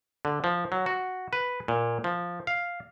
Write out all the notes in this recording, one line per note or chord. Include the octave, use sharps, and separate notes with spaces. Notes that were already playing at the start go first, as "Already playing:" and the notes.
D3
F3
F#3
F#4
B4
A#2
F3
F5